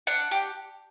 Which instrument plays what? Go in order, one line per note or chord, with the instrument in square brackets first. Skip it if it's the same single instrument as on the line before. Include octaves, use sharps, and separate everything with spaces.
[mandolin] D4 F#5
G4